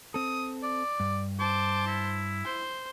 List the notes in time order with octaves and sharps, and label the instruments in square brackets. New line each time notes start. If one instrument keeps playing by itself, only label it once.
[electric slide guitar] C4 A4 [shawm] D#6
[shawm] D5
[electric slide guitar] G2
[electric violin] C5 A5 [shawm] D6
[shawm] E4
[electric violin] C5